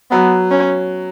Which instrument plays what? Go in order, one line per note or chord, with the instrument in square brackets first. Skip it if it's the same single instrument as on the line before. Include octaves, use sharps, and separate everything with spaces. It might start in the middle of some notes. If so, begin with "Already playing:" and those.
[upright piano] F#3 [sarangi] B3
[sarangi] C#4